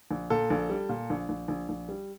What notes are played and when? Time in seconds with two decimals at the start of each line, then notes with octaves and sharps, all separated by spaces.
0.11 A#1
0.30 A#2 A4
0.50 A#1
0.70 G3
0.89 A#2
1.10 A#1
1.29 A#1
1.48 A#1
1.69 A#1
1.89 G3